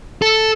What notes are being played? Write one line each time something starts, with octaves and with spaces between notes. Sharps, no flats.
A4